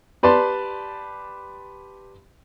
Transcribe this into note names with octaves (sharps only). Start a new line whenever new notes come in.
G4 B4 D5 A5 C6